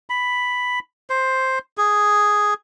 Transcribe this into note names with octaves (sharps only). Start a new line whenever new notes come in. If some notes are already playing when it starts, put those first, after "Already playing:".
B5
C5
G#4